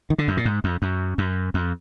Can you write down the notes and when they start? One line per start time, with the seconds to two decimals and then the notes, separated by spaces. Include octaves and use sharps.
0.10 D#3
0.18 D3
0.28 F#2
0.37 A#2
0.45 G#2
0.64 F2
0.82 F#2
1.18 F#2
1.54 F2